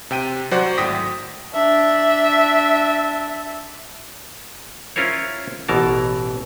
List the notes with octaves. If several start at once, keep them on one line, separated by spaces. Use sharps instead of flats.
C3 G5 D#7
F#3 F#4 C5 D5 F#5
G#1 A2 G5 D#6 A#6 B6
D4 E5
C#4 E4 F4 A#4 C5 C#5
A1 B2 E3 A#4 A5